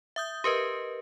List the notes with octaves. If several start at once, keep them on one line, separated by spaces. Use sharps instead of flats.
E5 D#6 G6
G4 A#4 B4 D#5